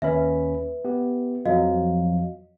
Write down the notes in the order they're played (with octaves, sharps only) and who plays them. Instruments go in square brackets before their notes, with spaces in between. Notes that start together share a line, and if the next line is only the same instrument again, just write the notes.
[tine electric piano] D#2 C#4 B5 [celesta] B4 E5
[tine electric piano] B3 G4
[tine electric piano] F2 F3 F#3 [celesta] F#4 D#5 F5